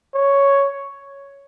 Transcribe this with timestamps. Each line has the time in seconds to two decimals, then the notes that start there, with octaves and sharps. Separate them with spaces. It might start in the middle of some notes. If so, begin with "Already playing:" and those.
0.14 C#5